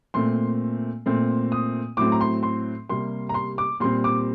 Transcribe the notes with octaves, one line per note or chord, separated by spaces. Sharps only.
A#2 A3 C4 C6
A#2 A3 C4
D#6
A2 F#3 A3 C4 D6
A#5
C6
C6
C3 G3 A#3 C6
A#5
C6
D6
A#2 G3 C4 C6
D6